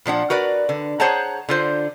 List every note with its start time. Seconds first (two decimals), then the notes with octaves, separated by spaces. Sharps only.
0.06 A#2 F3 D4 F#5
0.30 F#4 A#4 B4 D5
0.69 D3
1.00 G#4 C5 C#5 F#5 A5 A#5
1.49 D3 F4 C5